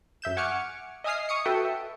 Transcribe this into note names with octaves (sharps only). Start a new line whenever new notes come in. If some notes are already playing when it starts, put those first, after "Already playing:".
F#2 E5 G6 E7
F#5 G#5 C#6 D6 F6 C#7
D#5 E5 G#5 D#6 F6 C7
C#6 D#6 C#7
F#4 A4 B4 E5 F#5 G5
E5